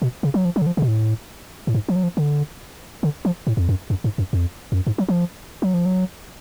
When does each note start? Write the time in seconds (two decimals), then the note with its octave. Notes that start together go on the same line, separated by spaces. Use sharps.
0.02 B2
0.23 C#3
0.34 F#3
0.45 F3
0.56 F#3
0.62 D3
0.66 F3
0.77 C#3
0.82 B2
0.88 A2
1.67 A2
1.74 G#2
1.89 F3
1.96 F#3
2.03 F3
2.17 D3
3.03 D3
3.25 F3
3.47 A2
3.57 F2
3.69 F#2
3.90 F#2
4.04 G#2
4.18 F#2
4.33 F2
4.72 F2
4.76 F#2
4.87 G#2
4.98 F#3
5.09 F3
5.62 F#3
5.74 F3
5.86 F#3